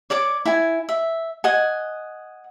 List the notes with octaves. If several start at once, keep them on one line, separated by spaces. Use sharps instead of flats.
C#5 D5 D6
E4 G#5
E5
D#5 F#5 G#5